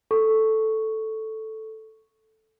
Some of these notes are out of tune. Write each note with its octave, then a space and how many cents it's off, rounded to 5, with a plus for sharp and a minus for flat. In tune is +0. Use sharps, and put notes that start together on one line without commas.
A4 +0 C#6 +0